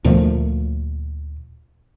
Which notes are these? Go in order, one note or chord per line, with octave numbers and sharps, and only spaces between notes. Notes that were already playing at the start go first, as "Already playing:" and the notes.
D2 A#2 F3 A3